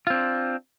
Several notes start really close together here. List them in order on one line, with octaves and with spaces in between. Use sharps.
F4 C4 D4